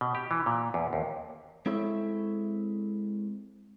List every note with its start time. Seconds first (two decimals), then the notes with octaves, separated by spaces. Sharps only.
0.01 B2
0.15 G4
0.31 E3
0.46 A#2
0.74 E2
0.93 D#2
1.66 G#3 C4 E4 A4 C#5 E5